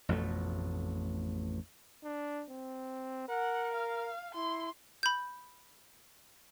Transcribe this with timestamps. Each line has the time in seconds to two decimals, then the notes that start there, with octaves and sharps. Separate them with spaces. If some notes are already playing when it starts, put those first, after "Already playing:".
0.09 A1 F2 B2 A3
2.04 D4
2.49 C4
3.29 A#4 F#5
3.74 F5
4.35 E4 C6
5.03 B5 G6